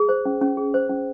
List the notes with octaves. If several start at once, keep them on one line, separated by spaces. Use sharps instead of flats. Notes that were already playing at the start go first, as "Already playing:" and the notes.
Already playing: G#4
C5
C#4
C#4
G#4
C5
C#4